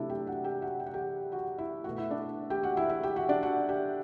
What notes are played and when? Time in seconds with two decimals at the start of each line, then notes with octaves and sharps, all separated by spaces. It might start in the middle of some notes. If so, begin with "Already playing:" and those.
Already playing: C3 F#3 A3 D4 E4 D5 E5
0.09 G4 G5
0.27 F#4 F#5
0.44 G4 G5
0.62 F#4 F#5
0.80 G5
0.86 F#5
0.93 G4 G5
1.32 F#4 F#5
1.58 E4 E5
1.84 B2 A3 F#4 F#5
1.98 E4 E5
2.11 D4 D5
2.50 G4 G5
2.63 F#4 F#5
2.77 E4 E5
2.89 E4 E5
3.03 G4 G5
3.16 F#4 F#5
3.29 D4 D5
3.43 F#4 F#5
3.69 G4 G5